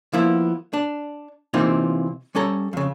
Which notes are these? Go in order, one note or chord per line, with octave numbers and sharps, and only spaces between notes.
F3 A#3 B3 E4
D4
C3 E3 A#3 C4 D#4 F4
G3 C#4 A4 A#5
F2 C#3